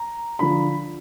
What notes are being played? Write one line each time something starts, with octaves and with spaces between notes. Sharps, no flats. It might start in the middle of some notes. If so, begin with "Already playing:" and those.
Already playing: A#5
D3 F3 B5